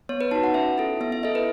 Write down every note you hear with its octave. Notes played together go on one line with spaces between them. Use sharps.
B3 C#5
B4
D#4 F#4 A5
F#5
C#4 E5
E4 A4
B3 E5
E5
E4 A4 D#5
B4